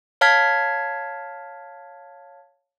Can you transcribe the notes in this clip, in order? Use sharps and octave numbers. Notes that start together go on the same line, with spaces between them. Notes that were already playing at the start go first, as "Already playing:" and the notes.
C#5 F5 A5 F6 G#6 B6